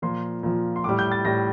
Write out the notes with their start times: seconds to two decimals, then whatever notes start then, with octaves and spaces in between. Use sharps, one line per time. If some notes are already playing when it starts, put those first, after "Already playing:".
0.02 A#2 F3 C6
0.43 A#2 F3
0.76 C6
0.84 A2 G3 D6
0.99 G6
1.12 A6
1.25 A2 G3 A#6